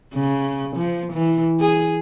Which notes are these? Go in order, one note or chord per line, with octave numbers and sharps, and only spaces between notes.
C#3
F3
E3
G#4